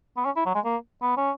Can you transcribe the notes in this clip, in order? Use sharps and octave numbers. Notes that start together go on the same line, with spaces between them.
B3
C#4
E4
F#3
G#3
A#3
B3
C#4